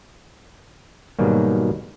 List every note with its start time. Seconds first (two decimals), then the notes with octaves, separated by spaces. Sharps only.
1.19 G#2 B2 D#3 F#3 G3 A#3